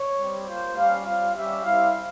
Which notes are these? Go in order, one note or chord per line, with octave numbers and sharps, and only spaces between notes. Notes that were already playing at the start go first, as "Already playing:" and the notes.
Already playing: C#5
G3 C4 G4
A#3 F4 C5
G3 C#4 G4 F5
G3 C4 F4 F5
G3 C#4 G4 E5
G3 C4 E4 F5